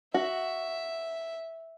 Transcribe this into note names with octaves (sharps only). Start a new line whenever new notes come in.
F#4 E5